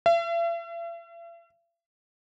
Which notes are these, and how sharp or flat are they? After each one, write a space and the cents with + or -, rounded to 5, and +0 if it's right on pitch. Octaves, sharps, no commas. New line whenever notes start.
E5 +45